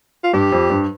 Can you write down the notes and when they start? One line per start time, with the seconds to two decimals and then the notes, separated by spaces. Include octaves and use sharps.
0.23 F4
0.33 G2 G4
0.52 F2
0.70 G2